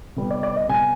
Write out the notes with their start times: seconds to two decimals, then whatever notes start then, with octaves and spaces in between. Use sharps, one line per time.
0.16 C3 G3 B3
0.31 D5
0.43 D5
0.56 D#5
0.69 C3 G3 B3 G#5